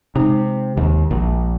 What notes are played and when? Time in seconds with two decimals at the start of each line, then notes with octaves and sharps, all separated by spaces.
0.16 C3 G#3 D#4
0.77 D#2
1.11 A#1